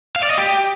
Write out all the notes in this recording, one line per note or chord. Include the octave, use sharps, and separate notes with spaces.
F5
D5
D#5
G4